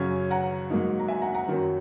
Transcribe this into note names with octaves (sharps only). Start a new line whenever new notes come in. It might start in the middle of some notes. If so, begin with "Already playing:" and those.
Already playing: F#2 C#3 F#3 C#4 G#6
F#5 A#5
G#2 F#3 A#3 D#4
A#5
E5 G#5
F#5 A#5
F#5 A#5
F#2 D#3 F#3